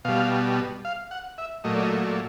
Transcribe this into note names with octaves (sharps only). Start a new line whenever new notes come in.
B2 G3 F5
F5
F#5
E5
A#2 F#3 A3 D#5
D5
D#5
D5